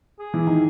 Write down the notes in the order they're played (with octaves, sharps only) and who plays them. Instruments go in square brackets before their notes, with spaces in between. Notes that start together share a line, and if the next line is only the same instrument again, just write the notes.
[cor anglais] G#4
[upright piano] E3 E4
D#3 D#4